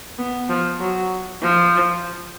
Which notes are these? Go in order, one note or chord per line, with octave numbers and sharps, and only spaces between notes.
B3
F3
F#3
F3